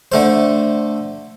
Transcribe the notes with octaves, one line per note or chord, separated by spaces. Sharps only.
D3 A3 C5